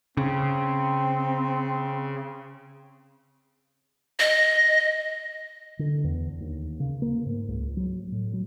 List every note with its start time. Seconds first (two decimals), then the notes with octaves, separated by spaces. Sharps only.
0.17 C#3 C4
4.20 D#5
5.79 D3
6.04 E2
6.40 D#2
6.80 C#3
7.02 A#3
7.26 G#2
7.48 C#2
7.77 F#3
8.12 A2
8.33 F#3